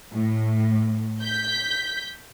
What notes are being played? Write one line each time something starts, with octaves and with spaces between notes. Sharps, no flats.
A2
G6 B6